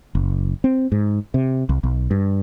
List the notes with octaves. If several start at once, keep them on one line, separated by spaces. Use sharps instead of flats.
F#1
C4
G#2
C3
C2
B1
G2